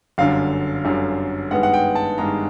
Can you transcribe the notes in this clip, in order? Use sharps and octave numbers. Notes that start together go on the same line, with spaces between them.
G1 F#2 D3 F5
G1 F#2 D3
G2 D#3 G#3 B3 F#5
F#5
G5
A5
G2 D#3 G#3 B3 A#5